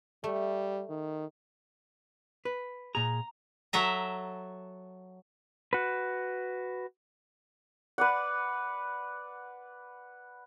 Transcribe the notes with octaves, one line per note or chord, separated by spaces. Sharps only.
G3 A3
D#3
B4
A#2 G#4 A#5
F#3 A4 E5 A#5
F#4 B4
B4 D5 F#5